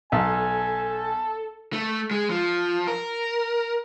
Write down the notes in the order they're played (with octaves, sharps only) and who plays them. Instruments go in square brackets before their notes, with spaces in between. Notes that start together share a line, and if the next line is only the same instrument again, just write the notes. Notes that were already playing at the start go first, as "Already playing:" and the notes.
[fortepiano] B1 [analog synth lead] A4 [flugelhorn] G#5
[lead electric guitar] A3
G#3
F3
A#4